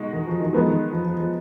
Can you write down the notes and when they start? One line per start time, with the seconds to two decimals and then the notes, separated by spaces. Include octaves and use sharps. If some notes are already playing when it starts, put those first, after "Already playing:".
Already playing: B2 G#3 D#4 F#4
0.13 D#3
0.27 F3
0.40 D#3
0.53 F3 G#3 B3 D#4
0.67 D#3
0.91 F3
1.05 F3
1.17 F3